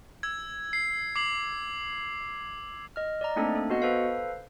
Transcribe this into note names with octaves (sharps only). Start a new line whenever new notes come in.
E6 G#6
C7
D6 C7 F#7
D#5 F6
D5 D#5 A#5
A3 A#3 C4 D4 D#4 A4
A4
B3 F#4 D#5 F#5
A4 B4 C5 F5